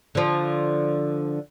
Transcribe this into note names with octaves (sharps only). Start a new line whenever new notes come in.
D3 F3